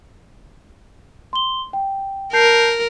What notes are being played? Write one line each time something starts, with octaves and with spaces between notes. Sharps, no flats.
C6 G7
G5
A#4 A5 G6 C7